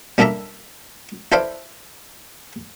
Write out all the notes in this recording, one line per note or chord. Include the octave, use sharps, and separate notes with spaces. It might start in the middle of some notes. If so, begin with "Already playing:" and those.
G3 A#3 D4 A4 E5 A#5
E4 A4 B4 C5 D5 F5